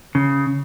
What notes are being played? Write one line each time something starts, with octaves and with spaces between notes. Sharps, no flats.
C#3